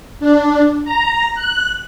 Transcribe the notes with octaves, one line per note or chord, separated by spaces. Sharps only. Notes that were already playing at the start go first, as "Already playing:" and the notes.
D4
A#5
F#6